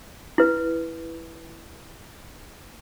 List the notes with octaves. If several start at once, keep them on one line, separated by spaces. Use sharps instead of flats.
E4 B4